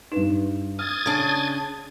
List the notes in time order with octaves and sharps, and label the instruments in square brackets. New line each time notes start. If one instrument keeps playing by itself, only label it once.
[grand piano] G2 E7 [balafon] D#4 B4
[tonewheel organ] D#6 G#6 A6 [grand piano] F6
[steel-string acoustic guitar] C#3 D4